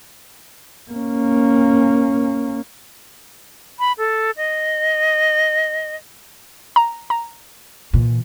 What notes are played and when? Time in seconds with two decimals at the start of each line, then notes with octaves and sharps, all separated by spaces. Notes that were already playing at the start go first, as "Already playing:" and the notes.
0.92 A#3 C#4
3.79 B5
3.98 A4
4.37 D#5
6.76 A#5
7.10 A#5
7.93 A#2 E3